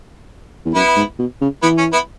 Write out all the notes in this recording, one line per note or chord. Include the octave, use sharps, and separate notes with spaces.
E2
F#2 B3 E4
G#2
B2
C#3
E3 B3 E4
C#4
B3 E4